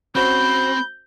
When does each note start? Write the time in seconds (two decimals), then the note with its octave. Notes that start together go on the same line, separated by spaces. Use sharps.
0.15 C4 C#4 F#4 C5 B5 G6